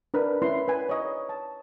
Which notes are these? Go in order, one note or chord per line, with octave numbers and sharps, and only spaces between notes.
D4 A#4 B4
C#4 E4 B4 C6
B4 G#5
C#5 D#5
A5